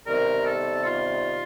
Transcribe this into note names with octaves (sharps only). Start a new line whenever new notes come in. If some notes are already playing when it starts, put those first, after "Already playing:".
C3 D#3 G3 B3 A#4
A4
F4